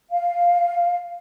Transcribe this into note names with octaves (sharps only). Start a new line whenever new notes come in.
F5